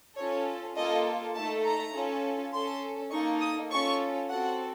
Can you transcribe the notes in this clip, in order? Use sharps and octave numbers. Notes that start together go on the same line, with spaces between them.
C#4 F4 A4 C#5
A#3 F4 A4 D#5
A3 D#4 A4 A5
A#5
C#4 F4 A4
C#4 A4 C6
A#3 D#4 A4 C#6
D#6
C#4 F4 A4 C#6
C4 F#4 A4 F#5